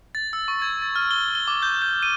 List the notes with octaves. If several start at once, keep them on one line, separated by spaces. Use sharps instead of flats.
A6
E6
C#6
G#6
A6
F6
G7
G7
D6
G6
G6
D#7